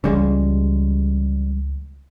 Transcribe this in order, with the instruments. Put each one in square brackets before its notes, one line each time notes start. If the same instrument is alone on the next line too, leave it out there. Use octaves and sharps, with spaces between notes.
[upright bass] C#2 E3 [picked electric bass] C#3 G3 G#3